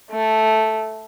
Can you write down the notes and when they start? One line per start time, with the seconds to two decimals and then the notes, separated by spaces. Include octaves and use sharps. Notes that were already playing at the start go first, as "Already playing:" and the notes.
0.11 A3